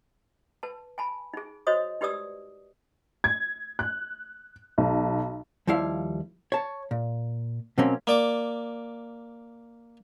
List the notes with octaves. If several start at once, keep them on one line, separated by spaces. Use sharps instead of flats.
B4 A5
G#5 A5 B5
D#4 G#4
F#4 C5 C#5 D#5 D#6
D#4 G4 B4 D5 D#6 E6
G#6
F#6
B1
D#2 F3 G3 E4 F5
C#5 A5
A#2
B2 F#3 A#3 C4 C#4
A#3 D5 D6